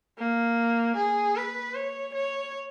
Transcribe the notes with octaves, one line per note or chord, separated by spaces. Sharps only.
A#3
G#4
B4
C#5
C#5